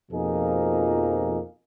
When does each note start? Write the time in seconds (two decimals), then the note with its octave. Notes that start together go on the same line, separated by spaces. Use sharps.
0.12 F2 B2 F3 A#3 D#4 G#4